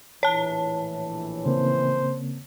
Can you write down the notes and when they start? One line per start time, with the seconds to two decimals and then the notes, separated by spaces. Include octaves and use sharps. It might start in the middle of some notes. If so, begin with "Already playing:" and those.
0.23 A#1 A2 E3 C#5 A5
1.46 C#3 A#3 C4 C5